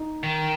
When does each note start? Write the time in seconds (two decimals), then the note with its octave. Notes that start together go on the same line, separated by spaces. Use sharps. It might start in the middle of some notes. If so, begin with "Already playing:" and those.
Already playing: D#4
0.23 D#3